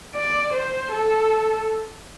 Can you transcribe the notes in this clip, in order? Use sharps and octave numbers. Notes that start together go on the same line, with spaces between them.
D5
C5
A4